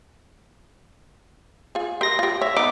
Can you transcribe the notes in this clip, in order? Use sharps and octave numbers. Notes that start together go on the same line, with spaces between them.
F4 G#4
G4 A#4 E5 C6 A#6
F4 G4
C#5 E5
B3 D#4 D6